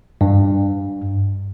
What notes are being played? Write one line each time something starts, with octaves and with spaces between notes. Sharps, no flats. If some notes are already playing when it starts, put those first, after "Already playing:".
G2